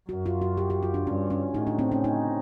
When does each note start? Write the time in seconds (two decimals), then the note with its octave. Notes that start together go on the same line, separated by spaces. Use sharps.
0.09 F#2 F#4
0.26 F4
0.42 F#4
0.57 G4
0.70 G4
0.83 F4
0.94 D4
1.06 G2 C#4
1.30 C#4
1.54 A2 D#4
1.67 D4
1.79 C4
1.92 C#4
2.04 D#4